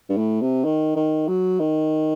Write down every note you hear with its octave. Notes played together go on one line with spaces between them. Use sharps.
G2
A2
C3
D#3
D#3
F#3
D#3